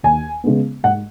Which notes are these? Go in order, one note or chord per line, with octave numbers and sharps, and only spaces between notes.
D#2 G#5
C#3 G#3 B3
G#2 F#5